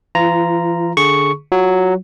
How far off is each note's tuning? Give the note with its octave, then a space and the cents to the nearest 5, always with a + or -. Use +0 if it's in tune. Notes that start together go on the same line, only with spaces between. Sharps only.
E3 +40 F4 -25 A#5 +0
D3 +0 G#4 +5 C#6 +0
F#3 +0 F4 +0